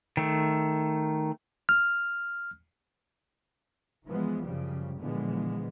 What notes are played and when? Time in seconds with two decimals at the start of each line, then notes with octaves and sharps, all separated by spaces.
0.17 D#3 A3
1.69 F6
4.06 E3 F3 G#3 B3
4.44 F#2 C#3 F3 G3
4.98 A#2 D3 E3 F3 G#3 B3